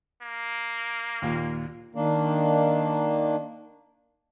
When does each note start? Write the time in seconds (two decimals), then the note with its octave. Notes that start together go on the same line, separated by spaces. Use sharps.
0.23 A#3
1.22 D#2 A#2
1.95 D#3 A#3 D4